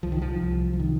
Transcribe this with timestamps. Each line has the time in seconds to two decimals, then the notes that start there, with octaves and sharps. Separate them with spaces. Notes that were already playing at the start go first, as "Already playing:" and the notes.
0.03 C2 F3
0.12 D#3
0.22 F3
0.42 C2
0.73 F3
0.79 C3 D#3